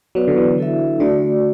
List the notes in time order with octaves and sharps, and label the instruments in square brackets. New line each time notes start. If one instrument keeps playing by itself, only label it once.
[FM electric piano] F#3 [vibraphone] B3 F#4 B4 D5
[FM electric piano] D3
E3
[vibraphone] E4 A4 E5
[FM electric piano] D3 [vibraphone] A3 F#4 D5